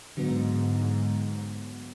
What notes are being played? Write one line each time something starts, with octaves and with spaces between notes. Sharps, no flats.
G#2 D3 F#3 B3